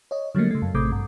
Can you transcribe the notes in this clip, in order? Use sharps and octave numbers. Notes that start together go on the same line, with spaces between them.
C#5 D#5
D3 F#3 G3 A3 A#3
C#3 A3
F#2
A1 C3 A3 D6 D#6 G6
G2